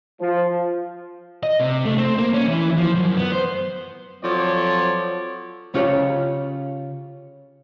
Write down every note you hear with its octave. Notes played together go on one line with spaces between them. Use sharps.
F3
D#5
C3
A3
C4
A#3
C#4
E3
F3
F#2
B3
C5
F3 F#3 C4 A4 C#5 D5
C#3 C#4 F4 G4 C#5